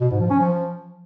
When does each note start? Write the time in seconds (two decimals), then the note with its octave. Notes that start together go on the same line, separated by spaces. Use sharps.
0.01 B2
0.11 G#2
0.20 F3
0.30 C#4
0.40 F3